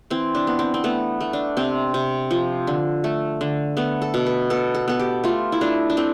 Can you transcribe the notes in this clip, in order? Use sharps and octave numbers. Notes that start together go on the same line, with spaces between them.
E3 C4
D4
B3
C4
C4
A3 B3
A3
D4
C3 C4
C3
F3
D3
A3
D3
A3 B3
A4
B2
B4
B3 A4
A4
B3 A4
G4
A3 F4
E4
A3 D4
D4
A3 C4